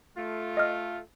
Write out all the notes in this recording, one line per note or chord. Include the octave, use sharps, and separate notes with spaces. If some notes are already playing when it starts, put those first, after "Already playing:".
A3 F4
D#5 F6